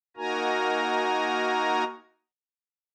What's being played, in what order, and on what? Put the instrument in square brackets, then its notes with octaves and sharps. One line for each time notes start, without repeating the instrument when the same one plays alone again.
[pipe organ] A#3 D#4 F#4 A#4 G#5 A#5